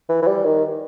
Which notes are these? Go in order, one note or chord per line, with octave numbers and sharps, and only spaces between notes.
E3
E3
G3
D#3